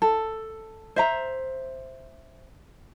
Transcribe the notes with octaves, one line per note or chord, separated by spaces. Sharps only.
A4
C5 E5 A#5